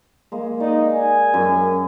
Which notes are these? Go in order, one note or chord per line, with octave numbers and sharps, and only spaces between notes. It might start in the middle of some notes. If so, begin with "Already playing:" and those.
G#3 A#3
D#4 D5 D#5
G#5
F#2